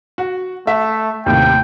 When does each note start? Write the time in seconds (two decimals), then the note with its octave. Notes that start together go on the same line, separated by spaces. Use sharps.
0.18 F#4
0.67 A3 E5
1.26 D#2 A2 C3 G5